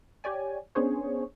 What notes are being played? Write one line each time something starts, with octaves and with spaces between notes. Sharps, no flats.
G4 C#5 D5 G#5
B3 C#4 D4 G#4 C5 C#5